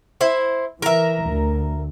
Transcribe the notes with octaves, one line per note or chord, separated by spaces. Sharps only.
E4 C5
E3 A#4 E5
D2